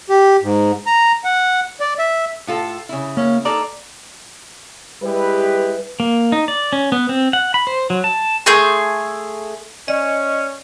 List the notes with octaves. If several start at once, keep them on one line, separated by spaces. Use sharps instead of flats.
G4
G#2
A#5
F#5
D5
E5
A2 F4 A4
C#3 E4
A#3 C#4
A#3 D#4 A4 D5 A#5
G3 G#3 E4 G4 B4
A#3
D#4
D5
C#4
B3
C4
F#5
B5
C5
F#3
A5
A3 G#4 C6 G6
C#4 D5 D#5